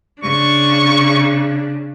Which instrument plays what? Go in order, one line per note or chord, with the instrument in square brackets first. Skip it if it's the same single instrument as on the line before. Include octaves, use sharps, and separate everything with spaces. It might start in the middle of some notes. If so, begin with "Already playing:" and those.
[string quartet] C#3 [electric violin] D4 [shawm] C#6